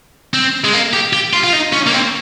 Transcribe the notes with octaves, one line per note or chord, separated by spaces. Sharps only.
C4
G#3
A#3
G4
G4
F4
F4
D#4
C#4
A#3
C4